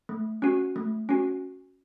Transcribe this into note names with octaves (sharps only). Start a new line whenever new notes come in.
A3
C#4 F#4
A3
C#4 F#4